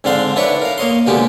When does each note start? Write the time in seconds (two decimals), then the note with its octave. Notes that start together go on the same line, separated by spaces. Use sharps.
0.04 G#2 D3 C4 D4 F5 C6
0.36 D4 E4 B4 C#5 D5 C#6
0.62 A#4 F5
0.78 A#3 C#5 D#5 C6
1.07 B2 D3 G#3 A#3 G4